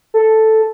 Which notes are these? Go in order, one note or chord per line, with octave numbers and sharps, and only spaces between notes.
A4